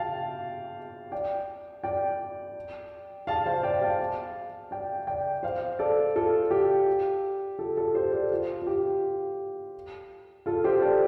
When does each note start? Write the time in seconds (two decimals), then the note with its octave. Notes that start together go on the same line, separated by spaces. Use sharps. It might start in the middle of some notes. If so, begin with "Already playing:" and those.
Already playing: F5 G5 A5
1.12 D5 G5
1.84 D5 G5
3.27 F5 A5
3.46 C5 F5
3.63 D5 G5
3.82 F5 A5
4.71 D5 G5
5.07 D5 G5
5.43 C5 F5
5.79 A4 D5
6.16 F4 A4
6.51 G4
7.59 F4 A4
7.77 F4 A4
7.95 G4 C5
8.12 A4 D5
8.31 F4
8.62 F4
8.67 G4
10.46 F4 A4
10.64 G4 C5
10.82 A4 D5